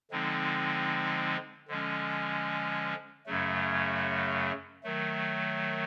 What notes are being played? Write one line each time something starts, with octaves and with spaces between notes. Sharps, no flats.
D3 F3 G#3 C4 D#4
D3 F3 G#3 C#4
F#2 C#3 F#3 A3
D#3 F#3 A3